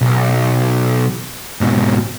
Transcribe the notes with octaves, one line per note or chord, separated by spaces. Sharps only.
B1
G#2 B2